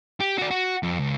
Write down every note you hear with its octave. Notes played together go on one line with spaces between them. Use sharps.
G4
F#4 D5
F#4
F2
C#2